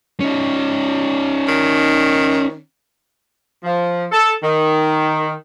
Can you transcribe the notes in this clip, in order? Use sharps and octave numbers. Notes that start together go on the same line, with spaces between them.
C#4 D#4
D#3
F3
A4
D#3